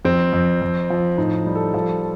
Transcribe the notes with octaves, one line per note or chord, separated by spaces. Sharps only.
F2 C4
F2
F2
F3
A2 D#4
G3
A4
F3 A4